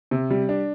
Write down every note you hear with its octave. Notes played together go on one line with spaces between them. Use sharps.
C3
G3
D4